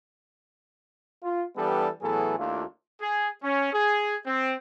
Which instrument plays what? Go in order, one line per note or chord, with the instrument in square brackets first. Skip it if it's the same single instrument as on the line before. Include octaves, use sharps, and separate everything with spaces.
[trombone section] F4
E3 G3 B3 D4 G4 A4
A2 E3 F#3 B3 G#4 A4
D#2 A3 D4 E4 F4
[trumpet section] G#4
C#4
G#4
C4